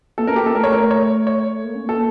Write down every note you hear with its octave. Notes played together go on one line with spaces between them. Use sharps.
A#3 A4
C#4 A#4
G4
A#3 A4
A3 A#4
C#5
A#4
C#5
C#5
A#3
C#4
A#3 A4